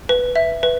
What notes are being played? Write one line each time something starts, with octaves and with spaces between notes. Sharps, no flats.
B4
E5
B4